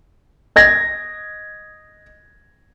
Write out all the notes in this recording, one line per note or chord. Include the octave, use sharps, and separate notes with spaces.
D#5 G#6 A#6